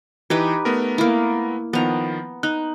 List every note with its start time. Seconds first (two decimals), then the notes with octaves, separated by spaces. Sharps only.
0.30 E3 D#4 G4 B4
0.65 A3 B3 A#4
0.98 A#3 E4
1.73 D#3 F3 B3 A#5
2.43 D#4 F#6